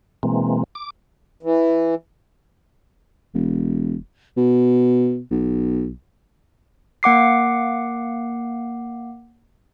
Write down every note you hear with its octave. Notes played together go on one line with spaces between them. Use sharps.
B2 E3 G#3 A#3 C4
D6
E3
E1
B2
B1
A#3 F#5 D6 C7